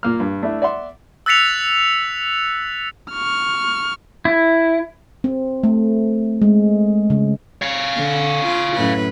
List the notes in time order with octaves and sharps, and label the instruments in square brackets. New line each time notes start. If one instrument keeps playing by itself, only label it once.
[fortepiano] A#2 A#3 F6
G2
A3 D4 E4
D5 E5 F#5 C6
[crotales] E6 F#6 A6 B6 C#7 F7
[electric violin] C#6 F6
[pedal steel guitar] E4
[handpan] C4
A3
G#3
C#3
[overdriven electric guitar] C#5 F5
[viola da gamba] D3
F4
F#2 A2 B4